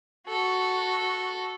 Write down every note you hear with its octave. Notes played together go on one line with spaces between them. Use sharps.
F#4 A4